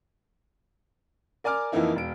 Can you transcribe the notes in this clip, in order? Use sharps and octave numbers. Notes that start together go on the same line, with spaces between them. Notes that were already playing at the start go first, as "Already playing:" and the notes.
A#4 D5 G#5 D6 F6
F2 E3 F3 A#3 D#4 E4
E1 D7